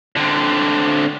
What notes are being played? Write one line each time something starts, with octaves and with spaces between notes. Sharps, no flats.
D3 C4